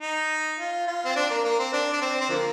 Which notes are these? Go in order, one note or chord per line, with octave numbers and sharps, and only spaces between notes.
D#4
F4
F4
C4
D4
A#3
A#3
C4
D4
D4
C4
C4
D3 F3 A#3